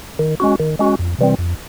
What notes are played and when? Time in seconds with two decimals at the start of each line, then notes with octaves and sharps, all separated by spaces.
0.19 D#3
0.40 G#3 C#4 F#4
0.60 D#3
0.79 G#3 C#4 F#4
0.99 F2
1.18 C3 E3 G3 C4
1.38 F2